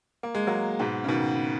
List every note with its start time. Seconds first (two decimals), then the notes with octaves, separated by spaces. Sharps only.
0.23 A#3
0.35 G#3
0.47 F#3 A#3
0.79 G#2 B2
1.04 C#3
1.09 B2 D#3